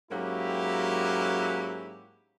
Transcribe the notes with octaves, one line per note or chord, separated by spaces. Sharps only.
G#2 F#3 A#3 C#4 E4 G4